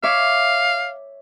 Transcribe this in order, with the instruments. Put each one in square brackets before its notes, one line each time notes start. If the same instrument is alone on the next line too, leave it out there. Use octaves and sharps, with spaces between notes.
[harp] C#5 E5 D6 [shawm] F5